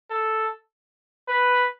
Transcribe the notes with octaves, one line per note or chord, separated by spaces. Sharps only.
A4
B4